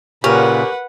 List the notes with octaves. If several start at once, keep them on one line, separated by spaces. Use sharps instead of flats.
A#2 C#3 C#4 G4 A#4 B4 F#5